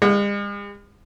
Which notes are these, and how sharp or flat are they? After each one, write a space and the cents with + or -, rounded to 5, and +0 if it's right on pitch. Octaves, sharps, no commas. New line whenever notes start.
G#3 -45 F#5 -15